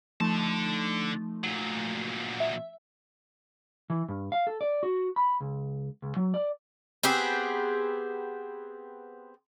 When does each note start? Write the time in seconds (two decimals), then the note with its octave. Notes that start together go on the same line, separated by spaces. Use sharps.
0.21 D3 F3 A3 D#4 A5
1.44 A#2 F#3
2.40 E5
3.90 E3
4.09 G2
4.32 F5
4.47 A4
4.61 D5
4.83 F#4
5.16 B5
5.40 C#2
6.02 C#2
6.16 F#3
6.34 D5
7.03 B3 C4 G4 G#4